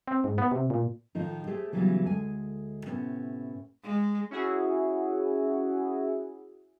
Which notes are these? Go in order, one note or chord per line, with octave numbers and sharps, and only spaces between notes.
C4
G#2
B3
C3
A#2
A2 D#3 F3 D#4
A3 G4 G#4 C5
C#3 E3 F#3 G3 B3 C#4
D2 G#3 G#5
A2 C3 B3 C#4
G#3
C#4 E4 F#4 G#4